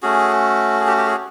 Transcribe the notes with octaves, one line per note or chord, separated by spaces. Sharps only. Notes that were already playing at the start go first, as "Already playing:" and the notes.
A3 C#4 F#4 G#4
G#4
G4
G4
G#4